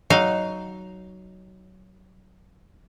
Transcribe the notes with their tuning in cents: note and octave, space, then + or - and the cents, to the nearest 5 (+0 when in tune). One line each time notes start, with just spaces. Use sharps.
F#3 +15 D#4 +0 F5 +0